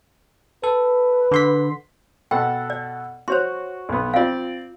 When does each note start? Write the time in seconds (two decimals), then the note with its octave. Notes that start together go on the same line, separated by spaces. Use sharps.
0.64 A4 B4
1.31 D3 C6 B6
2.31 B2 A4 F#5 G5
2.70 D5
3.28 F#4 C5 C#5 C6
3.89 B1 B3
4.14 C4 F4 D5 F5